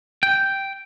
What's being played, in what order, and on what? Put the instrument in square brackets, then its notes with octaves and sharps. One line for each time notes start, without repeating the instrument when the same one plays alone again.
[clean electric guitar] G5